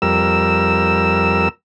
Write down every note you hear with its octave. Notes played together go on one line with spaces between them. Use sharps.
F2 G3 A#4 E6